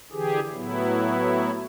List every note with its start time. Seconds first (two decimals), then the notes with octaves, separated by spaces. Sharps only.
0.12 D3 E3 G4 G#4
0.52 A2 F#3 B3 E4